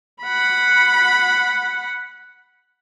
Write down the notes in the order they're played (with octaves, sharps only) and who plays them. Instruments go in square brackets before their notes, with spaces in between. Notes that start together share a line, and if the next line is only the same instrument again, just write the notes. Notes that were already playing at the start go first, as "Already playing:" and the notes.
[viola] F#5 B5